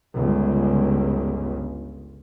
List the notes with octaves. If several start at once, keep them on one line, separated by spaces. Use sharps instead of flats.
G1 C#2